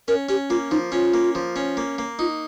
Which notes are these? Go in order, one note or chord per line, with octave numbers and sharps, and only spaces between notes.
C#4 A#4
C#4 G4
A#3 F4
F3 D#4
C#4 F4
A#3
F3
C#4
A#3
A#3
D#4 F4